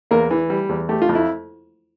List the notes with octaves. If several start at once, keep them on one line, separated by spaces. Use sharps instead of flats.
E2 A#3 A#4
E3
G3
E2
A3 G4
F4
F2
E4